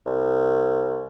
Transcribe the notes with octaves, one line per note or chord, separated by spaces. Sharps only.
C2